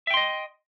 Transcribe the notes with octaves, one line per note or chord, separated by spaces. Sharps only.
D#5 E5 G5 C6